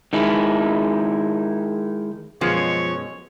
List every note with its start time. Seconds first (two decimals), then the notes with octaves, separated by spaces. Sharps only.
0.13 D#3 G#3 E4
2.41 F#2 B2 F3 G#3 C#5